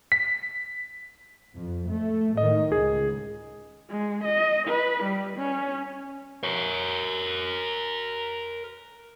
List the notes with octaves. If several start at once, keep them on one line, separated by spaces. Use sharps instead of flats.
B6
F2
A3
A2 D#3 D#5
C#2 G#4
G#3
D#5
B4
G3
C#4
A#4 C#5